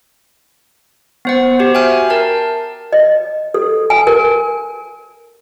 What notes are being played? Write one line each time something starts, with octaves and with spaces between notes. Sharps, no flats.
B3 C5 F#5
F#4 G4 C5
E5 G5 G#5 F6
A#4 A5
D#5
A4
G#5
A#4